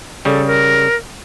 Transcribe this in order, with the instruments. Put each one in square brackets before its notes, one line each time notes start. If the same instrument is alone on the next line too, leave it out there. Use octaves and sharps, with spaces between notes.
[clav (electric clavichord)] C#3 G3 [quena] A4
[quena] A#4